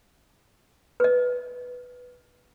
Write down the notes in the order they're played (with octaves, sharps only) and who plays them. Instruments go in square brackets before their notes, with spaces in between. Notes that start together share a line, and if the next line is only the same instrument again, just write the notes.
[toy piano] B4 D#5